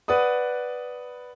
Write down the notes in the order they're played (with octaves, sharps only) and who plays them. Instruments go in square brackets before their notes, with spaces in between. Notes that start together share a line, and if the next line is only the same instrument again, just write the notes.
[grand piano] B4 D5 F#5 D#6